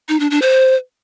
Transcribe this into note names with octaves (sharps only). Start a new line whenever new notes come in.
D#4
D4
D4
C5